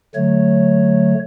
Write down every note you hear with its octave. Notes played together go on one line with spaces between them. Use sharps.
D3 F#3 A3 C#5